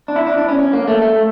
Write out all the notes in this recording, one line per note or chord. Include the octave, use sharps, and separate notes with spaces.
D4
E4
D4
D4
C#4
C#4
A#3
A3
A3